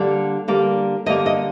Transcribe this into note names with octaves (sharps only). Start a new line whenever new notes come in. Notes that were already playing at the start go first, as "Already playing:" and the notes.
Already playing: D3 G3 A#3
D3 G3 A#3
D3 G3 A#3 D#5
D#5